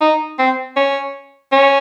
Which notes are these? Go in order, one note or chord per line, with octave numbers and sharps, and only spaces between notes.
D#4
C4
C#4
C#4